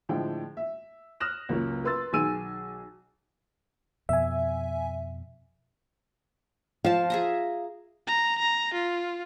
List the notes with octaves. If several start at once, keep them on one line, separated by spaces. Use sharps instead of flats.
A2 D3 F3 G#3 D4 G5
E5
D#6 F6 F#6 A#6 E7
C#2 F#2 A#3 C#4
A#4 B4 C6 E6 A6
B1 D#3 G#4 G#5 E6 D#7
F2 B2 E5 G#5
F3 F5 A5
G#4 E5 A#5
A#5
A#5
F4